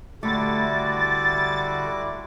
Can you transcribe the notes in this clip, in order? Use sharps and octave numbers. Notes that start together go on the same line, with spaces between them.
D3 G3 A3 E4 F#4 D6 A6